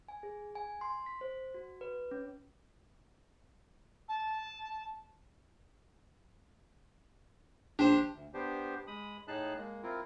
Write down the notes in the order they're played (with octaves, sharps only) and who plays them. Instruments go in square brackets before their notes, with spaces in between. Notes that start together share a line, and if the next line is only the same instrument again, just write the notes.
[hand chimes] G#5
G#4
G#5
C6
B6
C5
F#4
B4
C#4
[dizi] A5
[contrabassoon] A#1 [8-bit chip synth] D4 [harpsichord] G4 C5
[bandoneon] D2
B3 D4 G4 C5
G#3 B5 D#6
A2 D#4 G#4 A5 F#6
G#3 A#3
C4 E4 F4 A#4